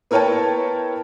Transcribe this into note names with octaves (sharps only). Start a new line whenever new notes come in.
B3 E4 A#4 C#5 G5 A5